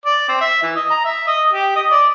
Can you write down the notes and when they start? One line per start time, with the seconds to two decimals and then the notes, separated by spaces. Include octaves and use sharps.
0.05 D5
0.29 C4
0.41 E5
0.62 E3
0.76 D#5
0.90 A#5
1.04 E5
1.27 D#5
1.53 G4
1.76 D#5
1.91 D5